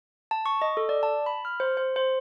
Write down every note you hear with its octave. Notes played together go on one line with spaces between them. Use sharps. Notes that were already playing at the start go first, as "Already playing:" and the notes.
A5
C#6
D#5
A4
D5
A5
B5
F6
C5
C5
C5